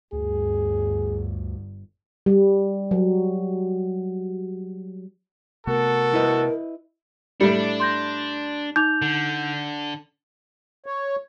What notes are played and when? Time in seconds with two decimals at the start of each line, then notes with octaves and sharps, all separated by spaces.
0.13 G1 D2 G#4
2.26 G3
2.91 F#3
5.67 C3 A3 B3 F#4 A4 A#4
6.14 E4 B4 D#5
7.41 A2 G3 D4 C#7
7.80 C6 G6 A#6
8.76 D#4 D6 G6 F7
9.02 D3
10.86 C#5